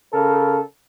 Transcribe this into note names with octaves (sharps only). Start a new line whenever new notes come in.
C#3 A4 A#4